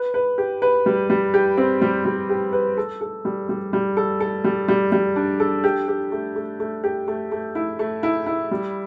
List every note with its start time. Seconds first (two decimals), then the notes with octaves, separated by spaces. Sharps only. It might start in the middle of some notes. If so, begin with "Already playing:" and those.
Already playing: B4
0.14 B4
0.38 G4
0.62 B4
0.86 G3
1.10 G3
1.34 G4
1.58 C4
1.82 G3
2.05 G3
2.29 G4
2.53 B4
2.77 A4
3.01 A4
3.25 G3
3.49 G3
3.73 G3
3.97 A4
4.20 A4
4.44 G3
4.68 G3
4.92 G3
5.16 D4
5.40 A4
5.64 G4
5.88 G4
6.12 A3
6.36 A3
6.60 A3
6.84 G4
7.08 A3
7.32 A3
7.55 E4
7.79 A3
8.03 E4
8.26 E4
8.51 G3